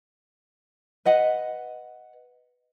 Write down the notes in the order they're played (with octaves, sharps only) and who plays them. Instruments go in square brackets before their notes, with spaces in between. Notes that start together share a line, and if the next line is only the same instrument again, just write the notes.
[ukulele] B4 D#5 F#5